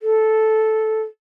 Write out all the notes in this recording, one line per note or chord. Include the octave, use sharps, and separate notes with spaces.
A4